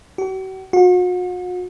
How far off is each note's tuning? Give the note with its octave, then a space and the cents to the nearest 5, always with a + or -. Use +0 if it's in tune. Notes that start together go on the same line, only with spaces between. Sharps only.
F#4 +45
F#4 -40